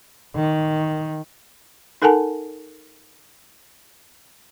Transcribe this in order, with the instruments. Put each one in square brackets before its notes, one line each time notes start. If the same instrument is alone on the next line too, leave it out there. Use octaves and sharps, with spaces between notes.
[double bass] D#3
[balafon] D#4 A4 A#4 F#5 G#5 A5